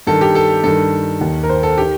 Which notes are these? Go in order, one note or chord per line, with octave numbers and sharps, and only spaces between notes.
G2 D#3 A4
G4
A4
G2 D#3 A4
D#2 D#3
A#4
C5
A4
D#3 G4